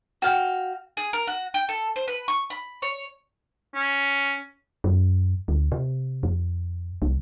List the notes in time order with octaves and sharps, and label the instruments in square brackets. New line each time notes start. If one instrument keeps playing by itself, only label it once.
[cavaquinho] F#4 F5 G5
[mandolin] G#4
A#4
F#4
G5
A4
C5
B4
C#6
B5
C#5
[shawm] C#4
[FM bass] F#2
D2
C3
F2
C2